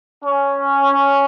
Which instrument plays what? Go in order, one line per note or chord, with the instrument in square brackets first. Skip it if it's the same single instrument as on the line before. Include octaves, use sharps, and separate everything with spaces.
[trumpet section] C#4